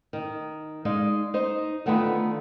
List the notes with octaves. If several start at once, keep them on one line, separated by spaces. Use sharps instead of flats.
D#3
G#3 D#4 D5 F5
D#4 C5
D3 D#3 A3 B3 F4 B4